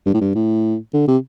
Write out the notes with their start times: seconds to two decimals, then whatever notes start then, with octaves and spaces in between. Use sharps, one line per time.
0.06 G2
0.14 A2
0.21 G2
0.35 A2
0.94 D3
1.08 C3